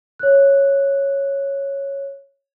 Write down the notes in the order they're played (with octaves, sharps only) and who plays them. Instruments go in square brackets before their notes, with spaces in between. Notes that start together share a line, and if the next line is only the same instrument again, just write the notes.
[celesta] C#5 F#6